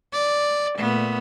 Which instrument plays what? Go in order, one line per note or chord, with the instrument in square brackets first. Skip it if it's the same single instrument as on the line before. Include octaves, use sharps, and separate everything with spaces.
[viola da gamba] D5
A#2 A3 B3